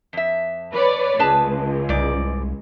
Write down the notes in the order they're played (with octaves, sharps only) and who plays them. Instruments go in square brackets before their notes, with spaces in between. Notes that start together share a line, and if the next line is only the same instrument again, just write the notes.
[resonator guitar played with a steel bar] F2 E5
[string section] B4 C#5 D5
[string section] C#2 [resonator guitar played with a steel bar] G#4 B4 A5
[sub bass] C2 [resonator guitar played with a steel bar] G#2 D5